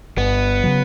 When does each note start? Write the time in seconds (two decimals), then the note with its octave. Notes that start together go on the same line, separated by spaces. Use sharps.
0.17 G1 B3
0.63 C#3 F#3